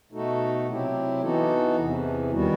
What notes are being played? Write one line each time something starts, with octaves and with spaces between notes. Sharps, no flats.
B2 A3 D#4 F#4 A4
C3 F#3 C4 E4 G4
E3 B3 D#4 F#4 A4
E2 C3 E3
D#2 D#3 G3 B3 F#4